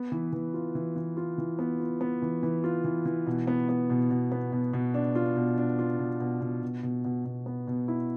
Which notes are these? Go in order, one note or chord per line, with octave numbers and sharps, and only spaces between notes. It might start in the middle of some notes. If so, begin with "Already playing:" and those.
Already playing: B3
E3
E3
F4
E3
E3
F4
E3
B3
F4
B3
E3
E3
F4
E3
E3
B2
B3
B3
B2
B2
B3
B2
B2
D4
F4
B2
D4
F4
B2
B2
B2
B2
B2
B2
B2
B3
B2
E4